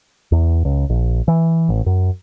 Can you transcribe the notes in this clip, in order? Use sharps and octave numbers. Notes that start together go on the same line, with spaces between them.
E2
C#2
A#1
E3
A1
F#2